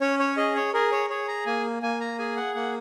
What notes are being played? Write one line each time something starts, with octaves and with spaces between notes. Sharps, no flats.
C#4 C#5
C#5
G#4 D#5
C#5
G#4 A#4
C#5
G#4 C#5
A#5
A#3 G#5
A#3 G#5
A#5
G#4 G#5
F#5
A#3 F#5